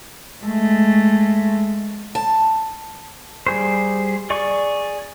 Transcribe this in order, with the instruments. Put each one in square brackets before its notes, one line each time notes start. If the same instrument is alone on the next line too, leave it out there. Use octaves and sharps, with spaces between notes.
[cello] G#3 A3
[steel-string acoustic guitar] A5
[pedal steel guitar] G3 G#4 C5
G#4 D5 C#6